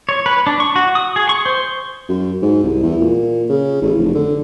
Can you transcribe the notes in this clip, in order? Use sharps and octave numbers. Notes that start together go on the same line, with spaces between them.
C#5
B4
D4
C#6
F#4
D#6
G#4
C#6
C5
F#2
G#2
C2
E2
A#2
C#3
A1
F1
D3